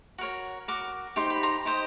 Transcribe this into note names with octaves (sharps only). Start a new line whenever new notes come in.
F#4 A#4 C#5
F#4 A#4 D6
D#4 G4 C5 C6
B5
A#5 C6
D#4 G4 C5 D#5